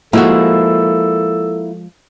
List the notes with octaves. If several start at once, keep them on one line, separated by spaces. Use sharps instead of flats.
F3 G#3 A#3 E4 F#4 A4